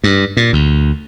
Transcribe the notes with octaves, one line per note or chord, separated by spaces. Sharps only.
G2
A#2
D2